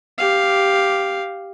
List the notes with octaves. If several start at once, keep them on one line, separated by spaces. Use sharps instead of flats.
G4 F5